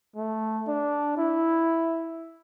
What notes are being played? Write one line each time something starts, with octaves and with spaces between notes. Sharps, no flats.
A3
D4
E4